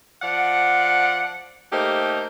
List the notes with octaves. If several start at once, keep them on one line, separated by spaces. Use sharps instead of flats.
F3 D5 F#5
A3 A#3 D#4 G4 C5